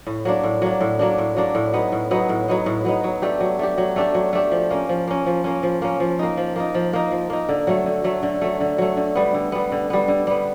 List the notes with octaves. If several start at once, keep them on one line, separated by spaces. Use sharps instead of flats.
A2
F#3 A#3 D4
A2
F#3 A#3 D4
A2
F#3 A#3 D4
A2
F#3 A#3 D4
A2
F#3 B3 D#4
A2
F#3 B3 D#4
A2
F#3 B3 D#4
A2
F#3 B3 D#4
F#3
A3 D4 G4
F#3
A3 D4 G4
F#3
A3 D4 G4
F#3
A3 D4 G4
F3
A#3 C#4
F3
A#3 C#4
F3
A#3 C#4
F3
A#3 C#4
F3
A#3 D#4
F3
A#3 D#4
F3
A#3 D#4
F3
A#3 D#4
D3
F#3 A3
D3
F#3 A3
D3
F#3 A3
D3
F#3 A3
D3
G3 B3
D3
G3 B3
D3
G3 B3
D3
G3 B3